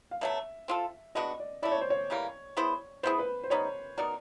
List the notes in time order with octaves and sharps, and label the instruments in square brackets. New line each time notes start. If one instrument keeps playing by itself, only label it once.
[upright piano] F5
[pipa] B2 F#3 A3 [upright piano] E5
[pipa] C4 F4 A4
[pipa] G#3 B3 D4 F#4 [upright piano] D#5
[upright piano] D5
[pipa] A3 C#4 E4 [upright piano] D5
[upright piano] C#5
C5
C#5
[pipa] C#3 E3 G3 A#3
B3 E4 G#4 C5
[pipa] B3 E4 G#4 [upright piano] C5
[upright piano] B4
C5
[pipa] G3 B3 D#4 [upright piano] C#5
[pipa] B3 D#4 F#4 A#4 [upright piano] D5